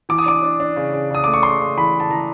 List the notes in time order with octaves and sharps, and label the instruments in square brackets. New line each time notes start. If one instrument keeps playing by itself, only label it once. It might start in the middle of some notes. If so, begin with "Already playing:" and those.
[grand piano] E3 D6
D#6
D4 D6
D4
D4
C#3
C#3
C#3 D#6
A3 D6
C#6
C#3 C6
C#3
E3 B5
C#3
A5
E3 A#5